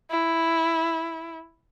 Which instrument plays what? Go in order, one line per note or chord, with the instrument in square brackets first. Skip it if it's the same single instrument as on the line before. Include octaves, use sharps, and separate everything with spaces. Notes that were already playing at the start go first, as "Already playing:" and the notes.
[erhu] E4